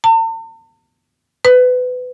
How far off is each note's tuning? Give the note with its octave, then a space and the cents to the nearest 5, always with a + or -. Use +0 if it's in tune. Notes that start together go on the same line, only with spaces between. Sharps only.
A5 +45
B4 +25